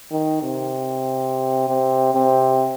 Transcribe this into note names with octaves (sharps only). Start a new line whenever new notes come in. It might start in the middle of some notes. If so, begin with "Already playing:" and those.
D#3
C3
C3
C3